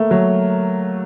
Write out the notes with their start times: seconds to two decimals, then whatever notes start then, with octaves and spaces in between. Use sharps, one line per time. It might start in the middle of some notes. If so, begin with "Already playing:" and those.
Already playing: A3 A#3
0.11 F#3